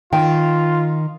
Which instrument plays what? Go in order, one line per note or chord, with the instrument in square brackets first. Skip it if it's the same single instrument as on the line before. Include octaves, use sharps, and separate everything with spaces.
[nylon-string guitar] D#3 [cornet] F4 [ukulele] G5